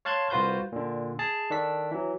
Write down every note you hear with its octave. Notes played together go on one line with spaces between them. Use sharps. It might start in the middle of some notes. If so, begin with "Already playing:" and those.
C#5 F5 A5 C6 F#6 G#6
C2 F4 F#4 B4 C5 G6
A#2 D3
G#4 A5
D#3 D4 A4 B6
E3 F#3